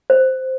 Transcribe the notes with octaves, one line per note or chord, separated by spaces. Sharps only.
C5